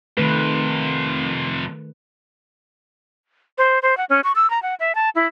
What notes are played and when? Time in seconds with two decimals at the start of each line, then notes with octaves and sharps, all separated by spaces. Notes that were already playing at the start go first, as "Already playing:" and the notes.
0.17 F2 C3 D#3 A3 B4
3.58 C5
3.82 C5
3.97 F#5
4.10 C#4
4.24 C#6
4.36 E6
4.50 A#5
4.62 F#5
4.80 E5
4.95 A5
5.15 E4